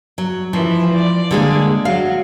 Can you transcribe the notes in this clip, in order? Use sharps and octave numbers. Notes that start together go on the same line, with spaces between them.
F#3
E3 F3
D5
D3 G#3 A#3
F#3 F#4 F5